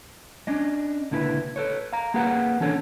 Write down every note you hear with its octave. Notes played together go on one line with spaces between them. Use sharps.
C#4 D4 D#5
C#2 A#2 D3 E4 A4 B4
A4 B4 C#5
F5 A#5
A#3 G4 G#4 B4 F#5
E3 C#4 D4 A4 C#5